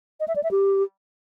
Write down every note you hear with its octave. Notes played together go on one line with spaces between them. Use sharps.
D#5
E5
D5
E5
G4